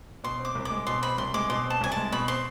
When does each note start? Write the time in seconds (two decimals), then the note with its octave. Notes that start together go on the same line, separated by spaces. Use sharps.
0.24 B2 C6
0.40 C4
0.45 D6
0.55 C2
0.65 D6
0.71 G#3
0.87 B2 C6
1.02 C4 B5
1.18 C2 C6
1.34 G#3 D6
1.49 B2 C6
1.65 C4
1.70 A5
1.81 C2 G#5
1.92 A5
1.97 G#3
2.12 B2 B5
2.28 C4 C6